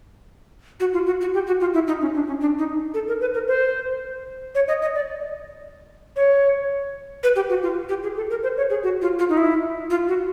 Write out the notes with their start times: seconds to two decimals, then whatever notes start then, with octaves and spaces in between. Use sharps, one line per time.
0.80 F#4
0.93 F4
1.07 F#4
1.21 F#4
1.34 G4
1.47 F#4
1.60 F4
1.74 E4
1.87 D#4
2.01 C#4
2.15 D4
2.27 C#4
2.40 D4
2.59 D#4
2.94 A4
3.08 A#4
3.21 B4
3.34 A#4
3.48 C5
4.55 C#5
4.68 D#5
4.82 D#5
4.95 D5
6.16 C#5
7.23 B4
7.36 G4
7.49 F#4
7.63 F4
7.89 G4
8.03 G#4
8.16 A4
8.30 A#4
8.43 C5
8.57 C#5
8.70 G#4
8.83 F#4
9.02 F4
9.19 F4
9.29 D#4
9.37 E4
9.90 F4
10.08 F#4